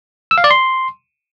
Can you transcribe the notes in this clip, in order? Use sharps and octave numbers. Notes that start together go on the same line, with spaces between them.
E6
F5
D5
C6